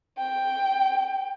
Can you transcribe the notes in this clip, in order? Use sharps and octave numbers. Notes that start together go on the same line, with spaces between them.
G5